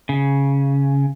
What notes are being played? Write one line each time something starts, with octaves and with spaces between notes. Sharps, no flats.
C#3